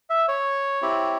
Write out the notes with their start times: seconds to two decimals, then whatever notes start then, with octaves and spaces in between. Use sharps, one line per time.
0.10 E5
0.28 C#5
0.82 C4 E4 G4